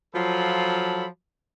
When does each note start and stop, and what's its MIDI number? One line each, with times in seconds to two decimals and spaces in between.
0.15 1.06 53
0.15 1.06 54
0.15 1.06 65
0.15 1.06 69
0.15 1.06 83